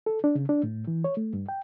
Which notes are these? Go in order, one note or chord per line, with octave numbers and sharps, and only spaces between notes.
A4
D4
C#3
D4
A2
E3
C#5
A3
G2
G5